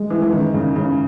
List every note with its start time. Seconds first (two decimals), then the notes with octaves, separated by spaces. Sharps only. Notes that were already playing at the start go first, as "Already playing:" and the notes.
Already playing: G#3
0.10 E3
0.22 E3
0.32 D#3
0.54 C#3
0.76 C#3